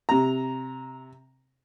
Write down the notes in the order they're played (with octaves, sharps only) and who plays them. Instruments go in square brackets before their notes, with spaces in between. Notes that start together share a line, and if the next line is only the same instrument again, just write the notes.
[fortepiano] C3 A#5